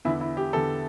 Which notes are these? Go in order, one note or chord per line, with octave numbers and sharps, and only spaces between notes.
E2 D3 E4
E4
G4
E2 D3 A4